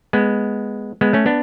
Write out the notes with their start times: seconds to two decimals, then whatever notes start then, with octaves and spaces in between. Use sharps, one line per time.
0.13 G#3 B3
1.01 G#3 B3
1.13 A3 C#4
1.26 B3 D4